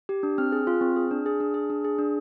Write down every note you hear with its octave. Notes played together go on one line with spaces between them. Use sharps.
G4
D4
C4 F6
G#4
F4
C4
G#4
D4
G#4
D4
G#4
D4
G#4
D4